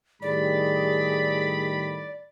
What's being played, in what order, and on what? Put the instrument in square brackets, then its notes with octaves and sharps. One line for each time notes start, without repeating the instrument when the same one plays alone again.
[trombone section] A2 D#3 G3 [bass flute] G#4 [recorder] D5 [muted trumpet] B5